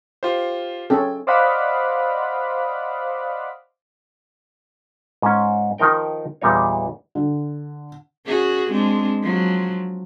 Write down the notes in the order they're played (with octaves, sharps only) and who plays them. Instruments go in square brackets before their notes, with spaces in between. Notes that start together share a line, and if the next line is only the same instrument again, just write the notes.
[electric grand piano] F4 G4 C5
[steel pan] C#4 A4 [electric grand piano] G5
[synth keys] C5 D5 D#5 F5 F#5 B5
[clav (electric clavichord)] G#2 C#4
D#3 F3 D#4 A#4 G5
E2 A#2 G3 D#4 C#5
[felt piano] D3
[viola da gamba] C#4 F#4 G#4
G#3 C4 D4
F3 F#3